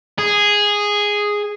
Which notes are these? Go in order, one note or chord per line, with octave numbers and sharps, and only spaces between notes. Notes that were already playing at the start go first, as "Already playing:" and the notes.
G#4